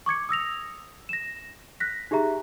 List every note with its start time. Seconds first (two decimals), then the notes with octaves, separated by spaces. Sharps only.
0.06 C#6 D6 G#6 C#7
0.29 D#6 E6 A#6 F7
1.09 A#6 E7
1.80 F#6 A#6 B6
2.11 D#4 G4 G#4 E5 A#5